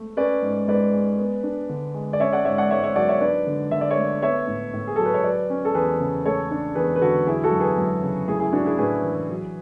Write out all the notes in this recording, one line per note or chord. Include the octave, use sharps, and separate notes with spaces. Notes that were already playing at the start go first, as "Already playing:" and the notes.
Already playing: A3
C#4 B4 D5
G#2
G#2 B4 D5
G#3
B3
D4
D3
G#3
D5
C#4 C#5 E5
D5 F#5
G#2 C#5 E5
D5 F#5
G#2 C#5 E5
C#5 E5
F#3 D5 F#5
C#5 E5
D4 B4 D5
D3
D3 E5
D5
C#5 E5
A3
B3 C#5 E5
A2
A2
G#4
F#3 A4
B4
C#5
F#3 B4 D5
C#4
A4
E2 G#4 B4
C#3
A3 A4 C#5
D4
E2 G#4 B4
B4
D3 F#4 A4
F#3 E4 G#4
F#4 A4
F#2
G#4 B4
F#2
C#3
A3 E4 G#4
E4 G#4
D4 F#4
E4 G#4
A2 G#4 B4
E3
F#3